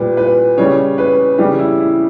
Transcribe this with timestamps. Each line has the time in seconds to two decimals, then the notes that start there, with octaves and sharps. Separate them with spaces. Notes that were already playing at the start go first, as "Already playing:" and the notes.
Already playing: A#2 G3 B4
0.17 B4
0.57 C#3 G3 C#5
0.98 B4
1.38 C#3 E3 G3 G4
1.58 E4
1.80 E4